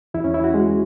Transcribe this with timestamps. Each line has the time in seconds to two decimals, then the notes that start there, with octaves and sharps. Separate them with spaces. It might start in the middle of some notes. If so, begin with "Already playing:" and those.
0.14 E2 E3 E4
0.24 C#4
0.34 E4
0.44 F#4
0.54 G#3